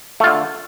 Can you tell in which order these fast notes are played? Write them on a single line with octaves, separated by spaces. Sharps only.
A3 F4 D3